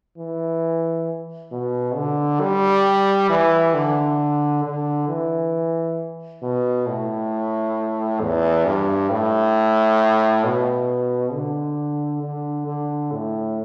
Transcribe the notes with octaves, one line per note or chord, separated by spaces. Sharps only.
E3
B2
D3
G3
E3
D3
D3
E3
B2
A2
E2
G2
A2
B2
D3
D3
D3
A2